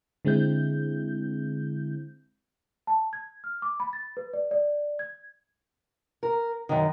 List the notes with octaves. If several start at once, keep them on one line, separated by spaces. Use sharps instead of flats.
D3 G#3 C4 E4 G6
A5
G#6
F6
D6
B5
A6
B4
D5
D5
G#6
A#4
F#2 D#3